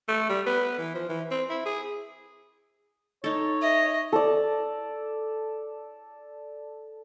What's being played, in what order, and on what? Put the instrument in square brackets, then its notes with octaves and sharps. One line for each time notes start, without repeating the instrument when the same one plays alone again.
[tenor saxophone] A3
G3
B3
E3
F3
E3
C4
E4
G#4
[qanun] D#4 A4 [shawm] C#5
[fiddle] D#5 [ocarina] E5
[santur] A4 D5